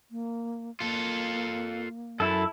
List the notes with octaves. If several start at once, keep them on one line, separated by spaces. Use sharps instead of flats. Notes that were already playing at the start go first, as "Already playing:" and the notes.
A#3
A#3 F4 A4
F#2 E4 A4